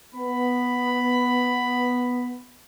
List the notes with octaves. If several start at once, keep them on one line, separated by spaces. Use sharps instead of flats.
B3 B5